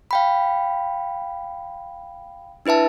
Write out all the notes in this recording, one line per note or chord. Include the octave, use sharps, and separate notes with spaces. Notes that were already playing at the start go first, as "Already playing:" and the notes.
F5 G5 B5
D4 E4 B4 E5 A5